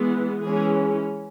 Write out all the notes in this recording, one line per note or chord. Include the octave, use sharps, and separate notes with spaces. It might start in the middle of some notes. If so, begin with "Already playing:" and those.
Already playing: E3 G#3 B3
E3 G#3 C#4 G#4